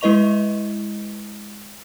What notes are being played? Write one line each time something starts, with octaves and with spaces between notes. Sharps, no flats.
G#3 E4 B4 D#5 C#6 F7